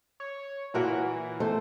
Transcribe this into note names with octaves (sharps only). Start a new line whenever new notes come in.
C#5
A#2 E3 F#4 A#4
A3 C5